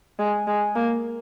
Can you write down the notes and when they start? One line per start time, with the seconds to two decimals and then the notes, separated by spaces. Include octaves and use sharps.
0.19 G#3
0.47 G#3
0.75 A#3